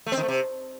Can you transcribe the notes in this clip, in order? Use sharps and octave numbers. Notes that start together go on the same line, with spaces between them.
A3
C4
D#3
A3
C3